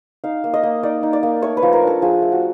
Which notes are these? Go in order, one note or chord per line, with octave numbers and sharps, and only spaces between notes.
D#4 F5
A#3
D#5
A#3
D#4 D5
D#4
D5
A#3
A3 C#5
B4
F3
A#4
D4
A4
F3 G#4
A3
F#4